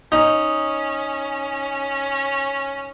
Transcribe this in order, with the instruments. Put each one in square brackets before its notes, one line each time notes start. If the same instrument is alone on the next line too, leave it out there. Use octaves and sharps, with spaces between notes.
[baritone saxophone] C#4 [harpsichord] D#4